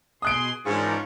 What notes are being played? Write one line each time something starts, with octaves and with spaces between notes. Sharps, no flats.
B2 G#4 C6 D#6 F#6 D7
G#2 E3 C#4 D4 F4 A#4 C#6